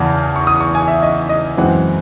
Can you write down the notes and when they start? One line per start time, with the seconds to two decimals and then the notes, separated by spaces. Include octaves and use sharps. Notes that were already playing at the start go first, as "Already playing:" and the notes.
Already playing: E2 C#3 E3 A5
0.36 C#6
0.47 D#6
0.61 C#6
0.75 G#5
0.88 E5
1.03 D#5
1.29 D#5
1.57 F#2 E3 G#3 C4 F#5